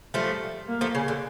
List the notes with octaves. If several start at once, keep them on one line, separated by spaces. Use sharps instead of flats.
F3 G3 A3
A#3
F3 A3
C#3
D3